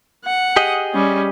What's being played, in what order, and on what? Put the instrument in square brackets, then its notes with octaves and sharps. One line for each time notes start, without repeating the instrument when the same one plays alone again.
[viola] F#5
[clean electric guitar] G4 G#4 D#5
[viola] G3 C#4